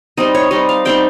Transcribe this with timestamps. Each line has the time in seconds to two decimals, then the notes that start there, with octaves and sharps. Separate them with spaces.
0.17 G3 C4 D#4 D#5
0.35 C#5
0.51 G3 C4 D#4 D#5
0.69 F5
0.85 G3 C4 D#4 G5